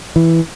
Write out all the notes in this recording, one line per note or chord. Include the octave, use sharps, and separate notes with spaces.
E3